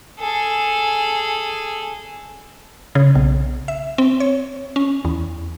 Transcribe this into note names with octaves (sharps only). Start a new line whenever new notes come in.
G#4 A4
C#3
B1
E5
C4
C#5
C#4
E2